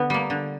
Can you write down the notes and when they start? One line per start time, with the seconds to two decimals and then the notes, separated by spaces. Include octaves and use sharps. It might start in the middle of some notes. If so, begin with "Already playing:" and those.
Already playing: D3 B3
0.10 G3 A#3
0.30 D3